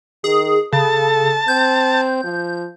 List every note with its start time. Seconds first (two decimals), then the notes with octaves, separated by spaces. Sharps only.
0.24 D#3 G#4
0.73 C#3 A4 A5
1.48 C4 G6
2.24 F3